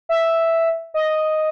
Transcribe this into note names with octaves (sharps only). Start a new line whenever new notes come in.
E5
D#5